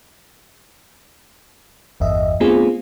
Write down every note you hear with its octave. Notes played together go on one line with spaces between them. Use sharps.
G1 E2 D#5 E5
A3 B3 C4 D4 F4 G#4